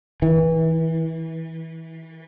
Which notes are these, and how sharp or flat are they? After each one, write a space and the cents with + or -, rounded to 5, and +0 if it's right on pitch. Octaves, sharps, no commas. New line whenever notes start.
E3 -25